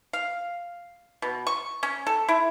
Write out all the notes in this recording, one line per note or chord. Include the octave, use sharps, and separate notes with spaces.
F5
B2
C#6
C#4
A4
E4